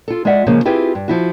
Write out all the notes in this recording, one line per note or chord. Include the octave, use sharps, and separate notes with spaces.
F4 A4
G#3 F4 D5 E5 F#5
C#3 F3 G#3 A#3 C#4
C4 E4 F4 G4 G#4 B4
G2
F3 E4 F#4